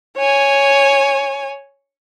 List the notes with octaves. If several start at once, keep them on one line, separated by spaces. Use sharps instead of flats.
C#5 G#5